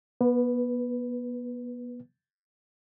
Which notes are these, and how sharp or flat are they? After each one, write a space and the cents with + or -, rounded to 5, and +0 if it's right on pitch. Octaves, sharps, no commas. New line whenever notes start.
B3 -30 B4 +0